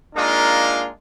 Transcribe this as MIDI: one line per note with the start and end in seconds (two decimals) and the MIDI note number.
0.15 0.88 56
0.15 0.88 58
0.15 0.88 62
0.15 0.88 63
0.15 0.88 65
0.15 0.88 70